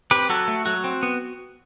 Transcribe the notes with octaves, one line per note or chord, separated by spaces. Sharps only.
C4 G4 B4
F#3 F#4 A4
A3
F#3 F#4
C4
B3